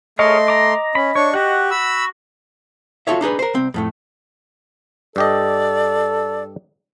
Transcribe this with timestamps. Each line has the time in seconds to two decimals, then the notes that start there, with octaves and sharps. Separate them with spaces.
0.19 A3 G#4 A#4 C#5 D#5 C6
0.48 A#5 D6
0.95 C#4 B5
1.15 D4 C#5 C#6
1.34 F#4 G4 F#5
1.71 B5 E6
3.07 F4 F#4 G#4 A4 C#5 E5
3.21 D4 D#4 G#4 B4
3.39 A#4 C5
3.55 C2 C4
3.74 F2 A2 A3
5.16 G2 G4 A4 D5 D#5